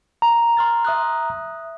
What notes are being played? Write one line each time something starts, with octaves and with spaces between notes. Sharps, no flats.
A#5
C6 F6 A6
E5 D#6 F#6